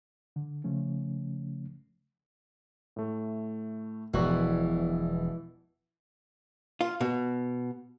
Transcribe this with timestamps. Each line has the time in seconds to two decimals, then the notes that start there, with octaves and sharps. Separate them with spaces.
0.36 D3
0.64 C#3 F3 A3 C#4
2.96 A2 A3
4.14 E1 A#1 B2 E3 F#4 D5
6.81 F4
7.01 B2